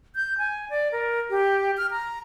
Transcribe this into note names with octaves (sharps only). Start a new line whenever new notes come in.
G6
G#5
D5
A#4
G4
F6
A#5